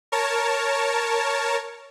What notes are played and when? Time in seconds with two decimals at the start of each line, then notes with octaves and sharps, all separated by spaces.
0.12 A#4 C#5 A5